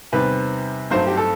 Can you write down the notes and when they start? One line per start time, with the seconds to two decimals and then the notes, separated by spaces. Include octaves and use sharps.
0.12 E2 C3 D#3 G3 C4 B4
0.91 G2 F#3 A3 C4 D#4 C5
1.07 G4
1.17 A4